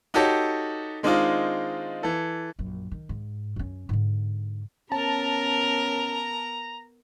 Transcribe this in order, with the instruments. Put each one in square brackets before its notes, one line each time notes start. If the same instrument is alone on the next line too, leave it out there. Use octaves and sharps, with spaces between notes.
[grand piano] D#4 F#4 G4 A4 C#5
D#3 G#3 C4 D4 D#4 F4
E3 A4
[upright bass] A#1 F#2
D#3
G#2
F#2 C#4
G#2 D3
[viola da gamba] B3 A#4 [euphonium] C#4 [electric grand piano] A5 [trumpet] A#5